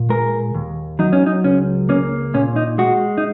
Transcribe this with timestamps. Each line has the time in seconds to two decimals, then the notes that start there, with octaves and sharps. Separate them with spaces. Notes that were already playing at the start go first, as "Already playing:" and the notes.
Already playing: A#2
0.09 G#3 A#4
0.55 D#2
0.99 F#3 D#4
1.13 C#4
1.26 D#4
1.44 C#2 C#4
1.89 A#3 C#4
2.34 A#2 C#4
2.56 D#4
2.78 G#3 F#4
3.18 D#4